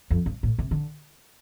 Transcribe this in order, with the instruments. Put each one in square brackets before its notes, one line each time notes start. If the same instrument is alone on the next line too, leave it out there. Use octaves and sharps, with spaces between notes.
[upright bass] F2
G2
A2
C3
D3